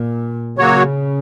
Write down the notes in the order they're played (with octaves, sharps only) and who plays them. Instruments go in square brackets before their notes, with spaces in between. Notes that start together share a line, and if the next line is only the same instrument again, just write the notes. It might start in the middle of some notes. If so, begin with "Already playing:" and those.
Already playing: [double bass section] A#2
[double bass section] C#3 [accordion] F#3 A#3 F#4 C#5